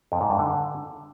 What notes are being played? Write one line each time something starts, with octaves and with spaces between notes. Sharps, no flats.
F2
G#2
G2
D3